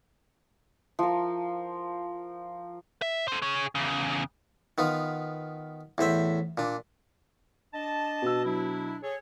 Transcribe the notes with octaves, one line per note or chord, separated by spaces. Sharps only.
F3 A#4
E5
A4 C5
G#4 C#5
E2 C#3
D#3 B3 F4
E2 A2 C5 E5
A#2 D4
D4 D#5 A5
B2 E6
F#3 D4 E4
G#4 A4 C#5